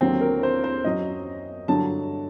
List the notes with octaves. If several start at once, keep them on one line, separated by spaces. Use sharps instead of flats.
D#2 D3 F#3 C4
A#4
C5
C5
F#2 F#3 D#5
G2 D3 F#3 A5